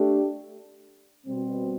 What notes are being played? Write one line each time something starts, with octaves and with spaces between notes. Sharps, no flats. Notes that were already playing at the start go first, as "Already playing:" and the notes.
Already playing: A3 D4 G4
B2 G3 C4